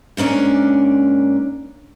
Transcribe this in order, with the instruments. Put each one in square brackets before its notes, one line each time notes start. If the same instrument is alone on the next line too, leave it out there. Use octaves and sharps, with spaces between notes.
[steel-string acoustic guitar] G#2 A#3 C#4 D4